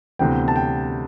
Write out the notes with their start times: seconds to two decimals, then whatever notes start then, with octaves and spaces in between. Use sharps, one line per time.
0.19 D2 C3 E3 B3 G5
0.48 A5
0.56 G5